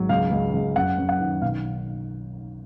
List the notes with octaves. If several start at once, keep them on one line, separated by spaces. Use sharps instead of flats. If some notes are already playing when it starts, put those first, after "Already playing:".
Already playing: G#1 F#3
C#2 F5
C#2
C#2
F#2 F#5
F#2
F#5
D#3
B1 F5